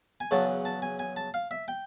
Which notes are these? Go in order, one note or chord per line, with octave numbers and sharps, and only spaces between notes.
G#5
E2 C#3 F#3 A5
A5
G#5
G#5
A5
F5
E5
G5